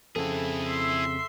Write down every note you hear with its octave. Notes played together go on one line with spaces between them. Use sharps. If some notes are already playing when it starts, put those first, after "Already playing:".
F2 C#3 C4 E4 G#4 A4
E5 C6